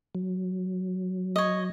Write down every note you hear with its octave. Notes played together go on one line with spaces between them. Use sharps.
F#3
C#5 D#5